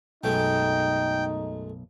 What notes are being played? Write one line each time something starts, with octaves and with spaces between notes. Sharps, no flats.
B1 F#2 G#3 A3 D#4 G5